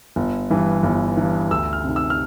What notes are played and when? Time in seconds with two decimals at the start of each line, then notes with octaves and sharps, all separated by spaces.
0.16 G1
0.50 G2 E3
0.83 G1
1.17 G2 E3
1.51 D2 E6
1.73 F6
1.84 C3 D#3
1.96 E6
2.10 F6